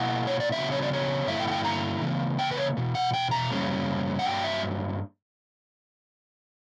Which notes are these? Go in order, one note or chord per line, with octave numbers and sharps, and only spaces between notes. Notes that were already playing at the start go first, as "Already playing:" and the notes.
Already playing: B2 A#3 E4 F#5
C#5
D5
C#3 F#3 B3 D4 E5
C#5
D5
C#5
G2 D3 A#3 E4 E5
G5
F#5
G5
A#5
C#3 E3 A#3
G5
B4
C#5
E2 B2
F#5
G5
A#5
F#2 C#3 G3 A#3 C#4
F#5
G2 F#3 A#3 D4 G5
E5